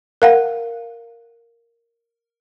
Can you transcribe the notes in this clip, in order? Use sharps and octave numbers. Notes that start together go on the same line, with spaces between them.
A#4 F5 F#5